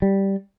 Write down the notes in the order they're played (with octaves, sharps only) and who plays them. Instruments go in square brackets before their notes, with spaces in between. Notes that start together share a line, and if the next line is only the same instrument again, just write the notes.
[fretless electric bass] G3